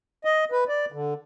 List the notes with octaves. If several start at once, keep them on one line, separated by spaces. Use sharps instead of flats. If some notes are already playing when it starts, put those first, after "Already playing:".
D#5
B4
D5
D3